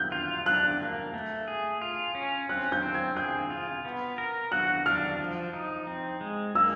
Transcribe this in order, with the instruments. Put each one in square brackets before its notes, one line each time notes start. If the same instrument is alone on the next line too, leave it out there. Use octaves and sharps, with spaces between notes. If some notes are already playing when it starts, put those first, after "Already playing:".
Already playing: [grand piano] F#6 G6
[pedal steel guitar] F4
[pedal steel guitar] D4 [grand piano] F#6
[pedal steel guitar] A#3
A3
G#4
F4
C#4
[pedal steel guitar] C4 [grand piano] F#6
[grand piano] G6
[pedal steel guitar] C4
[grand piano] G#6
[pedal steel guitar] G#4 [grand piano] G6
[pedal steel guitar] F4
B3
A#4
[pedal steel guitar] F#4 [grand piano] F#6
[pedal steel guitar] D4 [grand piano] F6
[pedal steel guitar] F3
D#4
C4
G#3
[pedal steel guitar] A#3 [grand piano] E6